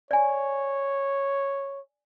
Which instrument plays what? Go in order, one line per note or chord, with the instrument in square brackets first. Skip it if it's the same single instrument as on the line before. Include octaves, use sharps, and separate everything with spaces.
[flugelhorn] C#5 [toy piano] D5 G#5